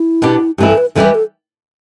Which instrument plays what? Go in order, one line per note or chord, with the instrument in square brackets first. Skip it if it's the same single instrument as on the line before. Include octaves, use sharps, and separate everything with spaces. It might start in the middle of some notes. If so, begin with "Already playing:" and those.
Already playing: [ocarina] E4
[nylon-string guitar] B2 B3 D4 G4
[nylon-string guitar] G2 E3 A3 E4 [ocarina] G4
[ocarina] A4
B4
[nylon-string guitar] E2 E3 G3 E4 G4 [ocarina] A4
[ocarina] B4
A4